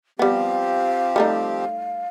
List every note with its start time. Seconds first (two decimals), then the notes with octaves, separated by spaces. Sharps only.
0.19 F3 G3 B3 C4 G4 F5
1.16 G3 A3 D#4